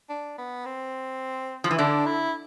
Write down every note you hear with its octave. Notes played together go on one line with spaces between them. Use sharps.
D4
B3
C4
F3
E3
D3 D4
E4